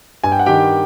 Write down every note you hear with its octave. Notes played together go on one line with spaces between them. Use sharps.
G2 G#5
G5
F#5
D#3 G4 G5